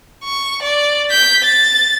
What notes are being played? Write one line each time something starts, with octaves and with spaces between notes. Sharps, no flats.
C#6
D5
G6 B6
A6